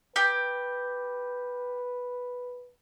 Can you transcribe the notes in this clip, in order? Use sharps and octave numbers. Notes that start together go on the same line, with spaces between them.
G4 B4